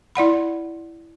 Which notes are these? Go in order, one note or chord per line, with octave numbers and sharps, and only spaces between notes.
E4 D5 F#5 B5